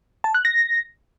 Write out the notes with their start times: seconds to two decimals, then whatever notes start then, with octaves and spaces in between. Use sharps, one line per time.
0.24 A5
0.34 F#6
0.45 A#6